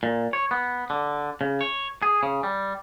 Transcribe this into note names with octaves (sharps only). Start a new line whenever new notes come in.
A#2
C#5
B3
D3
C#3
C#5
G#4
C#3
G3